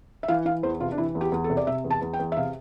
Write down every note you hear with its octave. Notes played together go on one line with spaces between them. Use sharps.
E5
E3 F5
E3 F5
E2 C5
C3 F4
D4
E3 E4
E2
G4
E2
A4
C3
D5
C3 E5
E2
A5
E2
G5
E2
E5
C3 F5